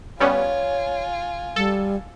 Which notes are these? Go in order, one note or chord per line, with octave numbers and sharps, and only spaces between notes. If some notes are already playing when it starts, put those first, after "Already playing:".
G3 B3 C#4 F4 C#5 G#5
G3 A4